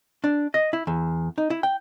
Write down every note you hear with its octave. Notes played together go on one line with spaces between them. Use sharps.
D4
D#5
E4
E2
D#4
E4
G5